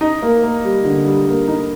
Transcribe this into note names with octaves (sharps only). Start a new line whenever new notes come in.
D#4
A#3
A#3
G3
D3
G3
A#3
D#4